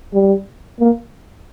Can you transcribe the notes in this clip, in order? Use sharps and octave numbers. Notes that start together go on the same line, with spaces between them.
G3
A#3